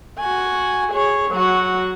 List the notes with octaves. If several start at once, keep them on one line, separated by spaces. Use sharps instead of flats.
F#4 G#5
G#4 C#5
F#3 F#4